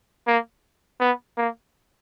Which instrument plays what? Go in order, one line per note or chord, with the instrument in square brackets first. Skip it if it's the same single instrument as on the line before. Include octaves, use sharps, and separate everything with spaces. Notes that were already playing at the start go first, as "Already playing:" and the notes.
[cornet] A#3
B3
A#3